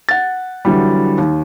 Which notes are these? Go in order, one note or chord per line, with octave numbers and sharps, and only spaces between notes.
F#5 A6
D3 E3 F#3 G3
D#2